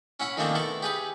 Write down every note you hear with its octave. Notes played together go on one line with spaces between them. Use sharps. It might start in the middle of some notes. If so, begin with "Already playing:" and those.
C#4 E4 F#5 B5
D#3 F3 A3 A#3 C4 D4
A3 B3 E4
G4 G#4 B4